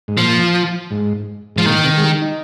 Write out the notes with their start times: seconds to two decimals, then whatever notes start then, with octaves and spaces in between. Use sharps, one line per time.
0.08 G#2
0.17 A#2 F3
0.91 G#2
1.56 G#2 F3
1.66 A#2 D#3
1.84 C3
1.97 G#3
2.02 G3
2.22 D#4